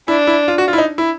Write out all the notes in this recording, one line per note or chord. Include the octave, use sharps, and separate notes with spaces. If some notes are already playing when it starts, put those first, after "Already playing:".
D4 E4
E4
F4
F#4
F4
E4
D#4
E4